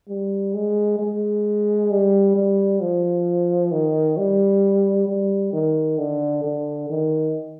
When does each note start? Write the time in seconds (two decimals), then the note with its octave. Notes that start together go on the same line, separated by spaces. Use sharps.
0.08 G3
0.54 G#3
0.99 G#3
1.91 G3
2.36 G3
2.81 F3
3.72 D#3
4.18 G3
5.08 G3
5.53 D#3
5.98 D3
6.44 D3
6.89 D#3